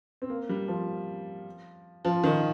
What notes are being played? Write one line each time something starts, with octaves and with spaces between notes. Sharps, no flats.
C4
A#3
G3
F3
F3
D#3